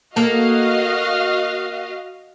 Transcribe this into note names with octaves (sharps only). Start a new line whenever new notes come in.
A#3 F#4 A4 D#5 F5